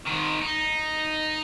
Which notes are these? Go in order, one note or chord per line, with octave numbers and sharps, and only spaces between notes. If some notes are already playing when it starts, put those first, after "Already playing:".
G#2 D#3
D#4